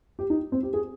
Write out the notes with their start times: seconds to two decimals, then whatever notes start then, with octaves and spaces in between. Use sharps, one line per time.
0.19 G4
0.30 D#4
0.52 C4
0.63 G4
0.74 G#4